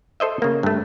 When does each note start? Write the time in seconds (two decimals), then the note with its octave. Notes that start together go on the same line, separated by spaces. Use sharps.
0.20 A4 C5 D#5 E5
0.42 C#3 A#3
0.63 G2 A3